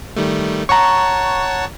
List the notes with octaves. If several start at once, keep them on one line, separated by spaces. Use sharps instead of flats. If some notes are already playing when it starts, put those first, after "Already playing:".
D#3 G3 A3
C#5 F#5 A5 A#5 C#6